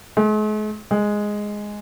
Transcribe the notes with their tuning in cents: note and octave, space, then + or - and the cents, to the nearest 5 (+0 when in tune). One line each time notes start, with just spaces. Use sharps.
G#3 +45
G#3 +0